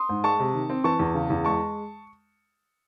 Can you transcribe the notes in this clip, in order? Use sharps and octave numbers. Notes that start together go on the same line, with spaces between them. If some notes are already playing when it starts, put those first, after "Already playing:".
Already playing: C6 D#6
G#2
G#3 A5 C#6
C3
D#3
C4
E3 A5 C#6
E2
C#3
E2
G#3 A5 C#6